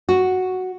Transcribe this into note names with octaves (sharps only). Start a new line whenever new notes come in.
F#4